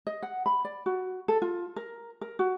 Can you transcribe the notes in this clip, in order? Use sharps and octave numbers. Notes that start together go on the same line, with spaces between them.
D#5
F#5
B5
D5
F#4
A4
F4
A#4
A#4
F#4